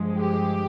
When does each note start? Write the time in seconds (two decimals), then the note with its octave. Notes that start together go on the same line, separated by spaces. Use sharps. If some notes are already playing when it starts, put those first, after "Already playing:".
Already playing: G2 F3 G#3
0.18 G4